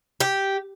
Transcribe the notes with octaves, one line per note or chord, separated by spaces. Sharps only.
G4